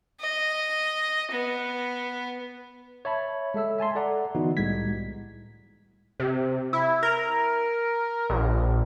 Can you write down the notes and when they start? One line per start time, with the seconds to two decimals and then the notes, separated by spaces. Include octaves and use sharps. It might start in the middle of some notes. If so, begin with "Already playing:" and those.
0.21 D#5
1.31 B3
3.05 C#5 E5 A5 B5
3.54 G#3 A4 E5 E6
3.78 E5 G#5 A5 C6
3.95 A4 D5 F#5 A#5
4.35 D3 E3 B3 D#4 F#4 B4
4.57 C2 A2 G3 G#3 G#6 B6
6.20 C3
6.73 E4
7.03 A#4
8.30 A#1